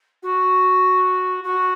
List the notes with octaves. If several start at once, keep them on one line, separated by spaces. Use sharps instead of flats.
F#4
F#4